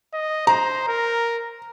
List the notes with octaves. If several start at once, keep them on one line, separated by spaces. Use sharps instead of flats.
D#5
C5 A#5
A#4